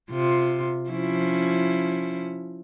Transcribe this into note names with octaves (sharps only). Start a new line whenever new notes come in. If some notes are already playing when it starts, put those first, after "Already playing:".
C3 F4
F3 C#4 E4